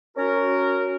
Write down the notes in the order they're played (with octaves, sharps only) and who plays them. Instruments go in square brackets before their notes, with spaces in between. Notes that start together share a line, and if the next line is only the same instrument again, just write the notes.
[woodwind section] C#4 F#4 A#4